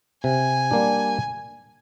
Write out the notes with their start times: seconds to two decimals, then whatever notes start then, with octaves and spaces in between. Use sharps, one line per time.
0.24 C3 G#5
0.71 G3 A#3 D4